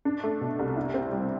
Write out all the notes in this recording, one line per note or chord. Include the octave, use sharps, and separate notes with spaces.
D4
A3
B2
C2
E4
C4
G3